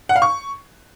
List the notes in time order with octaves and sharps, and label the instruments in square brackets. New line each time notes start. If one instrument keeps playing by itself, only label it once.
[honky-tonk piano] F#5
F5
C#6